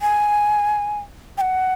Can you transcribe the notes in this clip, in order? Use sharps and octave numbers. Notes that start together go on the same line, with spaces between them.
G#5
G5
F#5